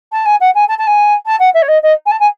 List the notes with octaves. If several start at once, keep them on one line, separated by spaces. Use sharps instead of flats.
A5
G#5
F#5
G#5
A5
A5
G#5
A5
F#5
E5
C#5
D#5
D#5
G#5
A5
G#5